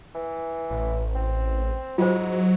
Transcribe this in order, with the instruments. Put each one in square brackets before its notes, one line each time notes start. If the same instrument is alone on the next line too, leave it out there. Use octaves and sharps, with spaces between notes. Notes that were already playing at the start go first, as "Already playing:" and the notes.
[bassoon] E3
[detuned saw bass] A1
[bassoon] C4
[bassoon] G#2 [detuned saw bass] F#3 [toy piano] F4 C5